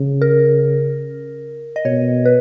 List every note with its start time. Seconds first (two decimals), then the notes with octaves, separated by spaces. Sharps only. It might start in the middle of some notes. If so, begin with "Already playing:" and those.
Already playing: C#3
0.22 A#4
1.76 D#5
1.85 B2 C#5
2.25 B4